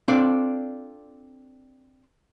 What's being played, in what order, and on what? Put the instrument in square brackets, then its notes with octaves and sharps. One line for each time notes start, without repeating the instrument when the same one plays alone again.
[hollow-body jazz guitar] C4 D4 F4 A4 D5